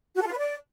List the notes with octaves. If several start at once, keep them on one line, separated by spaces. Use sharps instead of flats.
F#4
A4
F4
B4
D5